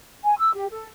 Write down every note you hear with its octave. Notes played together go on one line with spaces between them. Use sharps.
G#5
E6
G4
A4